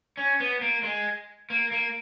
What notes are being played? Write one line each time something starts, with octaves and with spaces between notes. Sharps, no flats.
C#4
B3
A#3
G#3
A#3
A#3